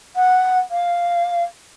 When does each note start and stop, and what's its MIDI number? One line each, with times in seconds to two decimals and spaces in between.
0.16 0.58 78
0.71 1.43 77